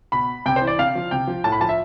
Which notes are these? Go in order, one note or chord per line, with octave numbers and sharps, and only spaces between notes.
B2 B5
C3 G5
C5
E3
D5
C3 F5
F3
C3 G5
F3
A2 A5
B5
F3 A5
E5